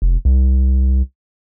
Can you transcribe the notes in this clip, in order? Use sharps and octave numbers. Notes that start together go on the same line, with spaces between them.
F1
C2